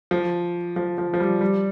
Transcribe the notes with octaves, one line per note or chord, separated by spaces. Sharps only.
F3
F3
F3
F3
G3
G3